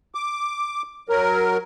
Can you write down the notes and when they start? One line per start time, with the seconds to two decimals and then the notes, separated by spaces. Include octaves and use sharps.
0.15 D6
1.09 F#3 A#4